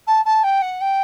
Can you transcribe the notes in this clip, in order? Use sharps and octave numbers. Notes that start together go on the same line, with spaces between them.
A5
A5
G5
F#5
G5